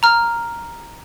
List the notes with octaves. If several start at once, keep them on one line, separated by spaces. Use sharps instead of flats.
A#5 F6